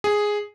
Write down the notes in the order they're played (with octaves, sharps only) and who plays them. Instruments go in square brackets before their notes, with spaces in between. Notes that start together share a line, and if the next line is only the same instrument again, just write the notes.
[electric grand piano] G#4